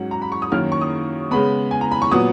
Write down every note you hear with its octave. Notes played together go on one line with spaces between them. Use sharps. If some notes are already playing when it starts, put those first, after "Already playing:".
Already playing: G#2 F#3 C#4 F#5
A#5
B5
C#6
D#6
F#2 D#3 A#3 C#4 F6
C#6
D#6
C#3 G#3 B3 B5
G#5
A#5
B5
C#6
A#2 F#3 B3 D#6